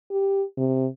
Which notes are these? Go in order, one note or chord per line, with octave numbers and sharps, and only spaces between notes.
G4
C3